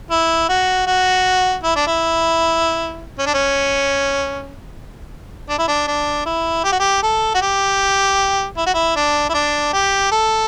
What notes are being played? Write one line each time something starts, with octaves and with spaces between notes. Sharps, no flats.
E4
F#4
F#4
E4
D4
E4
C#4
D4
C#4
D4
E4
D4
D4
E4
G4
F#4
G4
A4
F#4
G4
E4
F#4
E4
D4
E4
D4
G4
A4